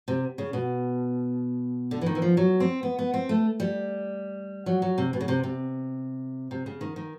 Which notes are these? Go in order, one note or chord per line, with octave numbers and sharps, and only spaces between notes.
C3
C#3
B2
D3
E3
D#3
E3
F3
F#3
C4
B3
B3
C4
A3
G3
F#3
F#3
C3
B2
C#3
C3
C3
C3
C#3
D#3
D#3